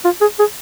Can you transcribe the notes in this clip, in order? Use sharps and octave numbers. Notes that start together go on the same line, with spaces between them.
F4
G#4
G#4